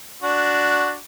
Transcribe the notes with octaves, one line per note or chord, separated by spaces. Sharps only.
D4 F#4